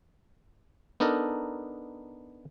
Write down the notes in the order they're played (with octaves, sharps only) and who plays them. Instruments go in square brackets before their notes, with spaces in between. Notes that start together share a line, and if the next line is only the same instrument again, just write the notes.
[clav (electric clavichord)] B3 D4 D#4 A4 A#4